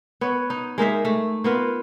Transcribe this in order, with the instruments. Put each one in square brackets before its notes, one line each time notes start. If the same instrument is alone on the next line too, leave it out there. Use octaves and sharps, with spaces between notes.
[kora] B3 C#5
D#4
G#3 A#3 D#4 E5
A3
A#3 B3 F4